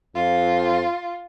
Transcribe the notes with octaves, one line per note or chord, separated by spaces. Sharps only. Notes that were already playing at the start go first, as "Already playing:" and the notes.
F2 F4